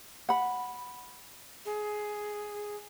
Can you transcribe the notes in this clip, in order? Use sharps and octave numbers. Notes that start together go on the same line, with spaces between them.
F#5 B5
G#4